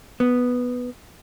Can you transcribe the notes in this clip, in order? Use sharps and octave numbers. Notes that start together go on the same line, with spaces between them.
B3